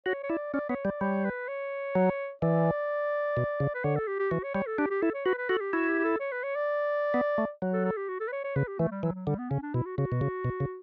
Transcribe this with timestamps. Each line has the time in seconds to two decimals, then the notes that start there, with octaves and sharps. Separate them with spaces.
0.06 F#4 C#5
0.23 C#5
0.29 E4 D5
0.54 C#4 D5
0.69 B3 C#5
0.85 G3 D5
1.01 G3 C#5
1.25 B4
1.48 C#5
1.95 F#3
2.42 E3 D5
3.37 B2
3.60 C#3
3.75 B4
3.84 D3 C#5
3.96 A4
4.08 G4
4.19 G4
4.31 E3 F#4
4.43 C#5
4.55 G3 C#5
4.66 A4
4.78 D4 G4
4.90 G4
5.02 E4 A4
5.14 C#5
5.26 F#4 B4
5.38 B4
5.49 F#4 A4
5.61 G4
5.73 E4 F#4
5.88 G4
5.99 G4
6.04 A4
6.20 C#5
6.32 B4
6.43 C#5
6.55 D5
7.14 B3
7.38 A3
7.62 F#3
7.73 A4
7.85 A4
7.97 G4
8.09 F#4
8.20 A4
8.28 B4
8.33 C#5
8.44 C#5
8.56 C#3 B4
8.68 G4
8.79 E3 A3
8.91 G3
9.03 E3 F#3
9.15 F#3
9.27 D3 G3
9.39 B3
9.50 C#3 C#4
9.62 D4
9.74 B2 E4
9.86 F#4
9.98 C#3 F#4
10.12 B2
10.21 C#3
10.45 B2
10.60 C#3